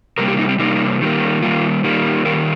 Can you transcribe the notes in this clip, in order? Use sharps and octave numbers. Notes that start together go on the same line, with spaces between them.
C3 G3 A#3 A#4
G4
D#4
C4
C3 G3 A#3 D#4
D#3 G3 A#3
D#3 G3 A#3 F4
D#3 G3 A#3
D#3 G3 A#3 A#4